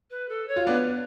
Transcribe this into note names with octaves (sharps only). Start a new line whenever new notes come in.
B4
A4
C#5
F4
B3 D4 B4